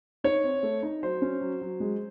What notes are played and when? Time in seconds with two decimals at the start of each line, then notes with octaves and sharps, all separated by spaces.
0.24 D#4 C#5
0.44 C4
0.63 A3
0.83 D#4
1.03 F#3 C5
1.22 C#4
1.41 F#3
1.61 F#3
1.80 G#3